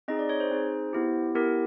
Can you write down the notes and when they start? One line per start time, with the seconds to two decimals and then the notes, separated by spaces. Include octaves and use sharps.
0.08 C4 D#4 G#4 D#5
0.19 D5
0.29 C#5
0.40 C5
0.51 C4 D#4 G#4
0.93 B3 E4 G4
1.35 B3 E4 G4 A#4